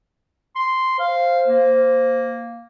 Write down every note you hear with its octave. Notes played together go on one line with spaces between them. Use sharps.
C6
C5 F5
A#3